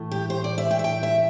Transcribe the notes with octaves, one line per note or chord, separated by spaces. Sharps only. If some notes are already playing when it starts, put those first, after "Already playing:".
Already playing: A2 E3 A3
G4
C5
D5
E5
G5
E5
G5
E5